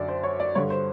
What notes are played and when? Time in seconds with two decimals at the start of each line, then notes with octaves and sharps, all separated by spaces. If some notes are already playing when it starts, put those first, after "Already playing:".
Already playing: F#2 D3 D5
0.08 C5
0.23 C#5
0.40 D5
0.55 G2 D3 C#5
0.70 C5